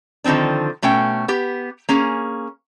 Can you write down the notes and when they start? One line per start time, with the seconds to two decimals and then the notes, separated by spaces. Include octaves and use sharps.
0.24 D3 D#3 F3 C4 D4
0.82 B2 A3 C#4 G5
1.28 B3 G4
1.89 A#3 C#4 G#4